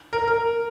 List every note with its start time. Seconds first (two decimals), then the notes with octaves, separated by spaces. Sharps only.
0.13 A#4
0.28 A#4